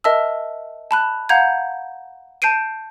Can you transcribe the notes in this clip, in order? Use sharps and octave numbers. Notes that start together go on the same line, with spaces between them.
A#4 D#5 E5 A5 E6
A5 B5 F#6
F5 F#5 A#5 G6 G#6
A5 G6 C7 D7 D#7